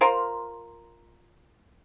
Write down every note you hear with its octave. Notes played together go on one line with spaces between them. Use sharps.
F4 A#4 C5